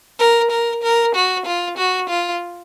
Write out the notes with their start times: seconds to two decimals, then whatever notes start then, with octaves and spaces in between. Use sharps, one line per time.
0.19 A#4
0.51 A#4
0.83 A#4
1.15 F#4
1.46 F4
1.77 F#4
2.09 F4